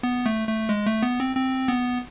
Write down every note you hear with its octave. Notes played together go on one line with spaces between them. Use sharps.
B3
A3
A3
G#3
A3
B3
C4
C4
B3